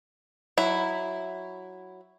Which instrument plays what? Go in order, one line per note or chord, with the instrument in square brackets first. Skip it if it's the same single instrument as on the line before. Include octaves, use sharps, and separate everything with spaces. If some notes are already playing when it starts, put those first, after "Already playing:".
[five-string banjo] F#3 E4